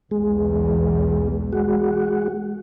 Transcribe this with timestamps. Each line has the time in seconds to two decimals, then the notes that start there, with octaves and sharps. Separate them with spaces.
0.11 B1 E2 G#3
1.53 G#3 F#4